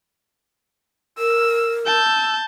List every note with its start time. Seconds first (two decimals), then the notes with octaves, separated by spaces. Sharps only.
1.18 A#4 E6
1.86 A5 E6 G6